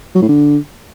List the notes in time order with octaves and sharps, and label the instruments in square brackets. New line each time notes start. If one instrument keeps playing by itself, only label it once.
[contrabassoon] F#3
A2
D3